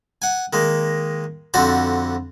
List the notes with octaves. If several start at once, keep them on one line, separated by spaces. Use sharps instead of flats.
F#5 G#5
D#3 G#3 A#3
F2 D3 F#4 C5 A5